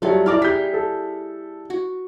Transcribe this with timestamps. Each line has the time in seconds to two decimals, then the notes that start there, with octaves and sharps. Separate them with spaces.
0.02 F#3 G3 A3 F4 C#5
0.26 E4 D5 F5 A#5 D6 F6
0.42 G3 G#4 G6 B6
0.74 A4
1.70 F#4